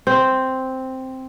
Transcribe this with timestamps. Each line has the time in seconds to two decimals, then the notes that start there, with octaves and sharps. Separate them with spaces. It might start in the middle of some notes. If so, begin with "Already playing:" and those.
0.07 C4